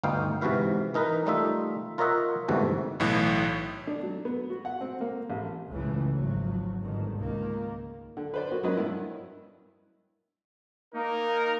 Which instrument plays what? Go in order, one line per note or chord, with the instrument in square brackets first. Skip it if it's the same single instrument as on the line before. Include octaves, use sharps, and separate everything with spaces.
[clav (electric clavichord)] G1 D2 B3 D#4 F5 G5
G#2 C3 E3 F#4 B4 F5
E3 D#4 A#4 B4
G3 A3 D#4 F4 E5
F4 A#4 C#5 D#5 E5 F#5
G1 G#2 C3 E3 A3 F#4
[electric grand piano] B1 A2 E3
[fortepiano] D4
F#3
B3
F#4
F#5
C4
A#3
A1
[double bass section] F#1 C#2 A2 C#3 E3
G#1 F3 F#3
G1 G#2 D#3
C#2 D#3 A#3
[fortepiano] D3
B4 C5 D5
A#3 F#4
F#3 A#3 C#4 B4 D#5
G2 E4
[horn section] A#3 D#4 [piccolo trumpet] A#4